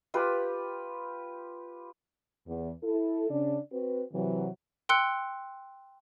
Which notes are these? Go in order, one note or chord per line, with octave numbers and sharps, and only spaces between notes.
F4 G4 B4
E2
E4 A4
C#3 D4
C4 F#4 B4
C3 E3 F#3
G5 C6 E6 F#6 C#7